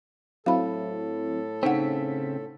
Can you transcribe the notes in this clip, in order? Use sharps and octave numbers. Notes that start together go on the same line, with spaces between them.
A2 F#3 C4 E4 A4 F5 B5
C#3 C4 D#4 F#5 B6